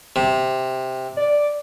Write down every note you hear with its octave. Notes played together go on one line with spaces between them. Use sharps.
C3
D5